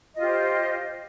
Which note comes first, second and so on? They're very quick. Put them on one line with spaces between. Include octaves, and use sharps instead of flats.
D#5 F4 G4 C5